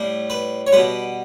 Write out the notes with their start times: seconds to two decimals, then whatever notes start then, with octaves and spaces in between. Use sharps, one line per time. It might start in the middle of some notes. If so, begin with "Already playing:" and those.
Already playing: A2 G3
0.30 B4
0.67 C#5
0.72 B2 G3 B4